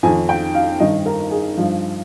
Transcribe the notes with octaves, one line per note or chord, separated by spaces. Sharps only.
F2 D#3 G#5
G5
F5
G2 D#3 D#5
A#4
G#4
G2 F3